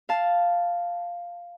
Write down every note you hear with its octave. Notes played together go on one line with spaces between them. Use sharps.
F5 A5